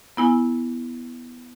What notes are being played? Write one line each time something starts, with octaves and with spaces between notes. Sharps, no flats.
B3 E4 G#5